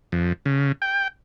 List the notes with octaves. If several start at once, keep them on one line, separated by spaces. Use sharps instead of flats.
F2
C#3
G5